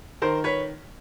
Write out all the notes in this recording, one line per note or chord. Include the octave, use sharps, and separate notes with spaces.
D#3 A#4 C5
B4 C#5